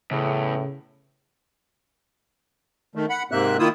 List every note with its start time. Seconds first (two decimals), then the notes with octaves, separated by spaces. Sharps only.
0.11 E2 A2 C#3
2.95 D#3 A3
3.10 F#5 B5
3.32 G#2 C3 A#3 C4 E5 F#6
3.59 D#3 A#3 E4 F4 D#6 E6